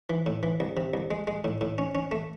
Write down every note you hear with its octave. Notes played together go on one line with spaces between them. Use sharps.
E3
A2
E3
C2
C3
C2
G#3
G#3
A2
A2
C#4
C#4
A3